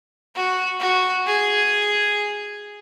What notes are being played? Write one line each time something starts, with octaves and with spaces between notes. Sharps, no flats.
F#4
F#4
G#4